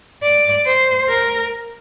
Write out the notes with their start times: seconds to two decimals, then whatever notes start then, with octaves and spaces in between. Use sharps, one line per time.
0.23 D5
0.66 C5
1.09 A#4